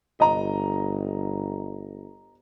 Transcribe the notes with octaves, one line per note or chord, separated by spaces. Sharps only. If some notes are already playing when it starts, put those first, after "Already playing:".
G1 D#5 A#5